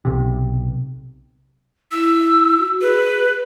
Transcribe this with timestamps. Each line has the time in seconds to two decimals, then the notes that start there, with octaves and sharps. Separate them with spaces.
0.05 B1 C3
1.92 E4 E6
2.59 F#4
2.81 G#4 B4